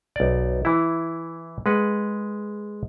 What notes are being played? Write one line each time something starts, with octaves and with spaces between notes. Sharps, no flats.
B1 D5
E3 E4
G#3 B4 F#5